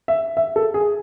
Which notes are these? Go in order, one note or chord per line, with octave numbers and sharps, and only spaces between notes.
E5
E5
A4
G#4